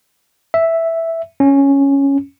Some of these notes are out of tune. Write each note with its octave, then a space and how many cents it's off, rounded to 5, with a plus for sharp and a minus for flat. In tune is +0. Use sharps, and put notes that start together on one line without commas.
E5 +0
C#4 +0